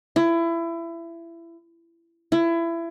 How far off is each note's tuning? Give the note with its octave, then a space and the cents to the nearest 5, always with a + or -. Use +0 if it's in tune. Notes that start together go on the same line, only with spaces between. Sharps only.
E4 +25
E4 +25